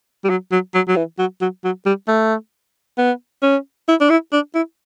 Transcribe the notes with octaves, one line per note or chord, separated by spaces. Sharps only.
G3
F#3
F#3
F#3
F#3
E3
F#3
F#3
F#3
G3
A3
B3
C#4
E4
D4
E4
D4
E4